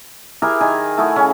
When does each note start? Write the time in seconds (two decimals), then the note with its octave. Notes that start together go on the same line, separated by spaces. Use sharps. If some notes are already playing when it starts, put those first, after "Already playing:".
0.42 E4 G4 G#4 A#4
0.61 D#3 G#5
0.98 A3 E4 F#4 G#4
1.16 C#3 C#4